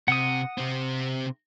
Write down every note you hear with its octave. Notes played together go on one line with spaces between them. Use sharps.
C3 F#5 D#6
C3 C4